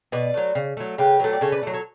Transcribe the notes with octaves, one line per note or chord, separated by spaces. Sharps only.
B2 B4 D5
F#3 A3
C#3
F#3 A3
C#3 G4 B4
F#3 A3
D5
C#3 A4 C#5
B4 D5
F#3 A3
A4 C#5